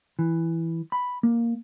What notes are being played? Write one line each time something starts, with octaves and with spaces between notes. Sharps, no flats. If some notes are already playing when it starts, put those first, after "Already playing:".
E3
B5
A#3